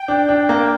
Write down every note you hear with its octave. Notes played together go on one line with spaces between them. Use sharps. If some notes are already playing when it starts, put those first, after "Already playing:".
Already playing: G5
D4
D4
A#3